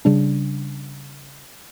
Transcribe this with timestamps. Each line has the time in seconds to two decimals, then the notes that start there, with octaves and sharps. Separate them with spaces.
0.05 C#3 G3 D4